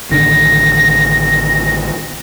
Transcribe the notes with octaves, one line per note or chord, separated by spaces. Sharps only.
A1 D3 D#3 A#6